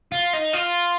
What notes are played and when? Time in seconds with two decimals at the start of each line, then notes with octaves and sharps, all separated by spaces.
0.12 F4
0.33 D#4
0.53 F4